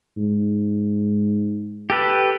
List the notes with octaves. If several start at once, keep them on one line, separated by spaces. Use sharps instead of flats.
G#2
G4 A4 B4